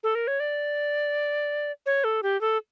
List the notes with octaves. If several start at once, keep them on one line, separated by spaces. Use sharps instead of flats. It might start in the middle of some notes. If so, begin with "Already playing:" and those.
A4
A#4
C#5
D5
C#5
A4
G4
A4